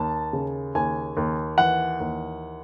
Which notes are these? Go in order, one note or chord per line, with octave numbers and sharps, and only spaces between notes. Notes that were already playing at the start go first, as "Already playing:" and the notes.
Already playing: D#2 A5
C#3
D#2 G#5
D#2
E3 F#5
D#2